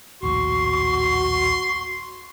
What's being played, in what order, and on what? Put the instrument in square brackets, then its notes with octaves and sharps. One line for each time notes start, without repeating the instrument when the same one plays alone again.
[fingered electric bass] A#1 D#2 A2 [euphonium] F#4 [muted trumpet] C6 [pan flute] C#6